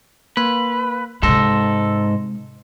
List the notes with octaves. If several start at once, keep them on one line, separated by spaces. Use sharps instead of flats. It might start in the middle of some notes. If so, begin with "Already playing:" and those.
A#3 B4
G#2 C3 G#3 A4 C6 E6 A#6